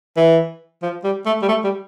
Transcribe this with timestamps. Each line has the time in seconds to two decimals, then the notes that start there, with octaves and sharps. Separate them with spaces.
0.17 E3
0.83 F3
1.04 G3
1.26 A3
1.42 G3
1.49 A3
1.64 G3